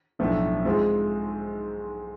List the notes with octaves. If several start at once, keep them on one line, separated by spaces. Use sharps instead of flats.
B1 A2 F3 A3 D4
G#2 G#3 C4 F4